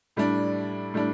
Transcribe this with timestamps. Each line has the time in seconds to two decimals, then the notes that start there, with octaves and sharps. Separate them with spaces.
0.16 A2 G3 D4
0.94 A2 G3 D4